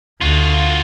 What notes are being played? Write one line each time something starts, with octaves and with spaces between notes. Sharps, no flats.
D2 F4 F#4